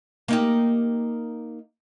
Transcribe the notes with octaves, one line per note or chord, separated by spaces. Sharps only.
A#3 D#4 G4